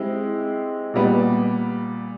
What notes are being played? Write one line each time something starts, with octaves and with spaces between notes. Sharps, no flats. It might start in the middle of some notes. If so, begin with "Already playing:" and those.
Already playing: G#3 C4 E4 G4
A#2 G3 B3